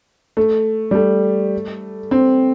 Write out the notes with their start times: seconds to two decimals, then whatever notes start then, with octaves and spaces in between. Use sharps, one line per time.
0.37 A3
0.91 G3
0.95 A3
2.11 C4